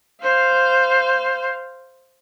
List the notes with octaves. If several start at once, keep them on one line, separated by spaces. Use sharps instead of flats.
C5 F5